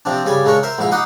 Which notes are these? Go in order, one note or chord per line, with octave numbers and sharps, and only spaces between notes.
C3 F3 C4 D4
G2 C#3 G4 D5 G#5 B5
C#3 G#3 D4 A#4 C#5
A#4 C5 E5
A#1 G#2 E4 F5 B5
D#4 D#5 F#5 B5 C6 D6